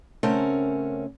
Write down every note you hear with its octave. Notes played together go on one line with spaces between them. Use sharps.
C#3 A3 C4 C#4 A#4 F#5